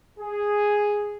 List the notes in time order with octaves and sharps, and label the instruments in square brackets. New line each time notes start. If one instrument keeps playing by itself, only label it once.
[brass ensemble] G#4